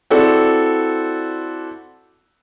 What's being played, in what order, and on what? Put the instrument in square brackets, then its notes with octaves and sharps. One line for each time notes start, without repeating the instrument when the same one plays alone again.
[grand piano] C4 E4 F#4 A4 D5